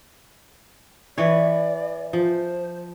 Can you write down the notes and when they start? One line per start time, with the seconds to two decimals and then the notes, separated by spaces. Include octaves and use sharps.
1.18 E3 B4 C#5 D5
2.13 F3 C5